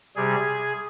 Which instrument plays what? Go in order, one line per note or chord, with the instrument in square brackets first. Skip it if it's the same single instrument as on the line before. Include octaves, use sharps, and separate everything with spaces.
[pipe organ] C3 G3 G#4